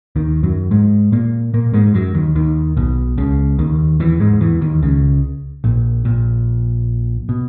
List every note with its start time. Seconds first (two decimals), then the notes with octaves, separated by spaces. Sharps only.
0.16 D#2 D#3
0.43 F#2 F#3
0.71 G#2 G#3
1.12 A#2 A#3
1.54 A#2 A#3
1.73 G#2 G#3
1.94 F#2 F#3
2.14 D#2 D#3
2.35 D#2 D#3
2.77 B1 B2
3.18 C#2 C#3
3.59 D#2 D#3
4.00 E2 E3
4.20 G#2 G#3
4.41 E2 E3
4.61 D#2 D#3
4.82 C#2 C#3
5.64 A#1 A#2
6.05 A#1 A#2
7.29 B2